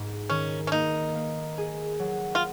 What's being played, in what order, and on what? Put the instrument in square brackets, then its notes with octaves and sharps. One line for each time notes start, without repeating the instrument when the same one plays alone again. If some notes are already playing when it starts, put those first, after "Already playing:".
Already playing: [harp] G#2
[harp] D#3 [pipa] C#4
[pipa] C#4
[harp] A#3 [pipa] D#4
[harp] A#3
G#4
F#3
[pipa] F4